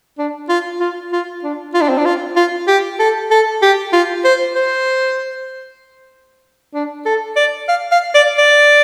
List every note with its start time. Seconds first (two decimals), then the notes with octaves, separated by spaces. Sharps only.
0.19 D4
0.49 F4
0.80 F4
1.12 F4
1.44 D4
1.74 F4
1.81 D4
1.89 C4
1.98 D4
2.05 F4
2.36 F4
2.68 G4
2.99 A4
3.31 A4
3.62 G4
3.93 F4
4.25 C5
4.55 C5
6.74 D4
7.06 A4
7.36 D5
7.69 F5
7.92 F5
8.15 D5
8.38 D5